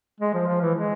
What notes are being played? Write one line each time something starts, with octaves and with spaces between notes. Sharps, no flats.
G#3
F3
F3
E3
G#3